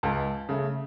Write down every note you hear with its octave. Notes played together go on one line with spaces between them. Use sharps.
C#2 A5
C#3 A3